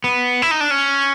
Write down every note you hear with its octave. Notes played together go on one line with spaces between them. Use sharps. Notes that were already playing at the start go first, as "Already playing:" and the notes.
B3
E4
D#4
D4
C#4